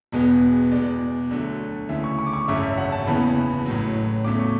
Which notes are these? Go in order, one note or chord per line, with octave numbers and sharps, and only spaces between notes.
E1 E2 B2 G#3 B3
E2 B2 G#3 D5
D2 D3 F#3 A3
D2 C#3 E3 E5
C#6
C#6
D6
C#6
G#1 F#2 C#3 E5
E5
F#5
A5
F#1 E2 C#3 E3 B3 B5
A1 A2 F#3
E2 C#3 F#3 A3 D6
C#6